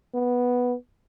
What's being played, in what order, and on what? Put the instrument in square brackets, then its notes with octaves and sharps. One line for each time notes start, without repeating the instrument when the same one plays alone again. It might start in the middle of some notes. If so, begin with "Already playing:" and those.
[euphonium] B3